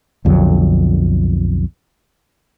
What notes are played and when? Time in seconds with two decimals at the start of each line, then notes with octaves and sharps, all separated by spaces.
0.25 B1 F2 D3 F#3